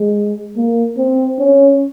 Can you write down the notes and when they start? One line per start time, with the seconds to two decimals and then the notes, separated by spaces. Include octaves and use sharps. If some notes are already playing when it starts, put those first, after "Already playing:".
Already playing: G#3
0.57 A#3
0.97 C4
1.39 C#4